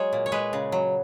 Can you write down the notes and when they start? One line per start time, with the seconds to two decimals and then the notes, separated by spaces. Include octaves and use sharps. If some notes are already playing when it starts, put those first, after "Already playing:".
Already playing: F#3 G#3 C#5
0.13 A#2
0.26 C#5
0.32 G#3 B4
0.53 C#3
0.72 F#3